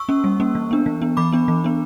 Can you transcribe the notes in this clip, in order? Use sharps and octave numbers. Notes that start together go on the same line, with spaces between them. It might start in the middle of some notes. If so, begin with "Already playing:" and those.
Already playing: C#6 E6
A#3 C#4
G3
A#3 C#4
E3
B3 D4
E3
B3 D4
E3 B5 D6
B3 D4
E3
B3 D4